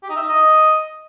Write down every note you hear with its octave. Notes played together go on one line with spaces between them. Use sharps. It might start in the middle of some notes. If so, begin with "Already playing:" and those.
G4
D#4
E5
D#4
D#5